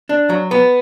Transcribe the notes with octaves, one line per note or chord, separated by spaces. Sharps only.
D4
F#3
B3